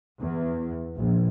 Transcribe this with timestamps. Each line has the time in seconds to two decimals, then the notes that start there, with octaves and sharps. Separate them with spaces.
0.19 E2
0.97 A#1